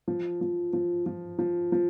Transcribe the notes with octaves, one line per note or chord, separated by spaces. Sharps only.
F3
F3
F3
F3
F3
F3